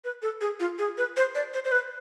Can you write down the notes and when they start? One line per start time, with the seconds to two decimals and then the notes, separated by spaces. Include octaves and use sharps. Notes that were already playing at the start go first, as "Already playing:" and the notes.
0.04 B4
0.22 A4
0.41 G#4
0.60 F4
0.78 G#4
0.98 B4
1.17 C5
1.35 D5
1.54 C5
1.65 C5
1.72 B4